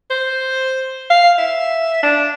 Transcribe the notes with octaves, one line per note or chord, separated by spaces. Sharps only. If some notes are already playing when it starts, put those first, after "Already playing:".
C5
F5
E5
D4